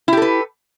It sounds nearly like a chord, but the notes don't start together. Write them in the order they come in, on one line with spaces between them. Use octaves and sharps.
E4 G4 A4 B4